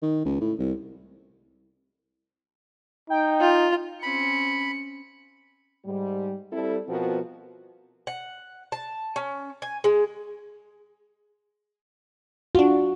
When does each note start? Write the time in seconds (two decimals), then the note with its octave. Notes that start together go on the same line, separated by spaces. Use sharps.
0.03 D#3
0.25 C#2
0.41 A2
0.59 C2
3.10 D#4 G5
3.41 F4
4.03 C4 C#4 B5 C#7
5.85 G#2 G3
6.52 G3 C4 E4 A4
6.88 B2 F3 B3 C4 F#4 A#4
8.07 F#5
8.72 A5
9.16 C#4
9.62 G#5
9.84 G#3
12.55 D4 F4 F#4